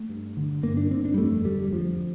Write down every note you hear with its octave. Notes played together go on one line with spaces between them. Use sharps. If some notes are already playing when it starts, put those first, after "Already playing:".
Already playing: A3
G2
D3
G2 A#3
D4
G2 C4
D4
G3
F2 A3
D3 G3
G3
F2 F3